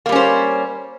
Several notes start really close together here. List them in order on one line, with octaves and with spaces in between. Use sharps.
A#3 G3 C#4 C5